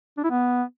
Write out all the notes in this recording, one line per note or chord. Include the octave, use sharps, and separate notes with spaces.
D4
E4
B3